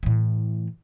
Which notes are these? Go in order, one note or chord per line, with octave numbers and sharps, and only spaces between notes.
A2 E3